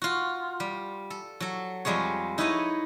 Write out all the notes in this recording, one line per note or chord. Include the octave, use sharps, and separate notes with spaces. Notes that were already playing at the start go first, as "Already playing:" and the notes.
F4 F#4
G3
A4
F#3 A4
F2 G3 G#3 G#4 C#5
D#4 E4 A4 B4 C#5 D#5